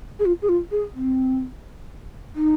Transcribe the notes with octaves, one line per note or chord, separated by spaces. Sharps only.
G#4
F4
G#4
F4
G#4
C4
D#4